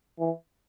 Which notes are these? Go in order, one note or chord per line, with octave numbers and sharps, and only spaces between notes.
E3